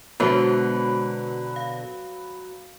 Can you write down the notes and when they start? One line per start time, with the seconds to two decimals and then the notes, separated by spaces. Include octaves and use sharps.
0.20 B2 D3 F#3 G#3 B3 B4 C5
1.56 F5